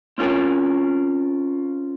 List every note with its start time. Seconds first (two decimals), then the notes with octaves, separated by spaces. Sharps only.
0.18 C4 C#4 F4 A#4 G#5